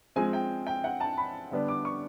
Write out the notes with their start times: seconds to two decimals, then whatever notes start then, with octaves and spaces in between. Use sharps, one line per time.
0.16 F3 G#3 C4 G#5
0.33 G5
0.67 G5
0.84 F#5
1.00 A5
1.18 B5
1.51 D3 G3 B3 D4
1.68 D6
1.85 C#6